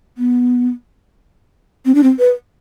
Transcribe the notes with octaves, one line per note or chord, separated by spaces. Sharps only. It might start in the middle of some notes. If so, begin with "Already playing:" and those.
B3
C4
D4
C4
B4